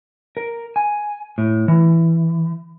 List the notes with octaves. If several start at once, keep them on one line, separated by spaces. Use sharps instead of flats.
A#4
G#5
A2
E3